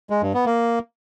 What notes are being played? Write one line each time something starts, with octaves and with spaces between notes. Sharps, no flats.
G#3
G2
B3
A#3